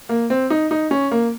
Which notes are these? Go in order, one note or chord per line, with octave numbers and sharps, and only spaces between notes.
A#3
C4
D#4
D#4
C#4
A#3